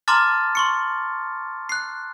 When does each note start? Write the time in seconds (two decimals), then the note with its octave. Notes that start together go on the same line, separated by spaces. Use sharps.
0.08 A5 A#5 C6 D6 F6 A6
0.55 C6 C#6 C#7
1.69 F#6 C7